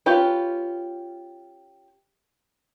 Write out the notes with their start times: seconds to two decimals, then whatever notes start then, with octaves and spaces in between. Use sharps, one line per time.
0.06 C#4 F4 G4 B4